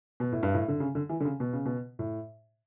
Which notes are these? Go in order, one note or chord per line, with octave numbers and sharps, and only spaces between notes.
B2
A2
G2
A2
D3
C#3
D3
E3
D3
C#3
B2
C#3
B2
A2